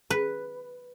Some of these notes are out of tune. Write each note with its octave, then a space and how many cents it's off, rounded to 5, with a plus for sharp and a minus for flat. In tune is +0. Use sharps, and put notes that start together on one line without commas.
B4 +0